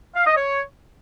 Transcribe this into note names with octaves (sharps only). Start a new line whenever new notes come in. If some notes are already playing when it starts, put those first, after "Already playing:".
F5
D#5
C#5